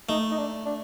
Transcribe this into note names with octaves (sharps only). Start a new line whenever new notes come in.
A3 D#4
D#4
D4
D4